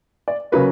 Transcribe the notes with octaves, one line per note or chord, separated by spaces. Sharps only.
D5
C#3 F#3 A#3 B4